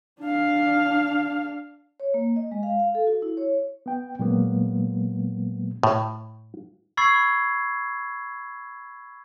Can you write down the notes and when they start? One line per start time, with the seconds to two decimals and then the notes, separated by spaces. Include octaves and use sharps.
0.20 D4 F5
2.00 C#5
2.14 A#3
2.36 D#5
2.52 G#3
2.63 F5
2.80 F5
2.95 A4
3.07 F#4
3.22 E4
3.37 C#5
3.86 B3 G5
4.19 A#2 F#3 G#3 A#3 B3
5.83 A2
6.97 B5 C#6 E6 G#6 A6 C7